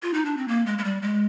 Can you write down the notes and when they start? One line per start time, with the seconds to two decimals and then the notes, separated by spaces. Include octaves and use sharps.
0.03 F4
0.14 D#4
0.25 D4
0.37 C4
0.48 A#3
0.66 G#3
0.78 G#3
0.84 G3
1.02 G#3